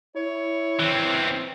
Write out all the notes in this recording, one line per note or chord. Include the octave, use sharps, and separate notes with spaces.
E4 C#5
E3 C4